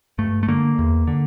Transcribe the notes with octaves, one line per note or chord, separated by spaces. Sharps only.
G2 A3
A3
D3 A#3
E2
D3